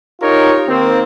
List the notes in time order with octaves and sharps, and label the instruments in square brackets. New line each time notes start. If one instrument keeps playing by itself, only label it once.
[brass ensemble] D#4 F4 G4 A#4 C#5
D#3 A#3 C4